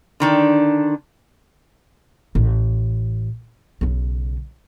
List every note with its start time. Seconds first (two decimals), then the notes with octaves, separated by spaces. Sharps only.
0.20 D3 D#3 D4
2.35 A1
3.81 B1 C#3